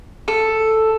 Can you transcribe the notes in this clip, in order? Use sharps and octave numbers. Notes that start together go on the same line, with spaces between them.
A4